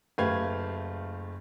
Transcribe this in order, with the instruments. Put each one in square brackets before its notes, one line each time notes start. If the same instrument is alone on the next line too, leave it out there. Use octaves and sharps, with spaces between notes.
[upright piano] F#1 A3 G4 B4 F5 G#6